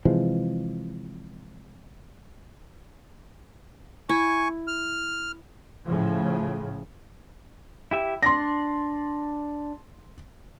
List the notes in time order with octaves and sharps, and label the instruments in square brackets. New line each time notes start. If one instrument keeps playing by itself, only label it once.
[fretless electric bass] C3 E3 F3 G#3
[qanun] E4 [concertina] G#5 C#6
[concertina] F6
[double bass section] A2 C#3 F3
[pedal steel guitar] E4 G4 E5
[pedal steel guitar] D4 D5 [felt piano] C6 A#6